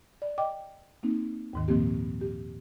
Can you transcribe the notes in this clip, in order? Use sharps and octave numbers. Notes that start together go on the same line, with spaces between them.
D5
D#5 G5 D6
A#3 C4 D#4
D#2 G#2 D#3
A#2 D#3 F3 A#3 C4 G4
G4